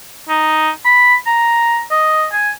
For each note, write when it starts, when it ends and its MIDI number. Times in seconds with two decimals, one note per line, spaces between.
0.29 0.70 63
0.85 1.15 83
1.26 1.82 82
1.91 2.26 75
2.32 2.50 80